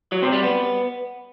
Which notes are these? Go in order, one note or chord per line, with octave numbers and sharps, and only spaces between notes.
F#3
C3
G3
B3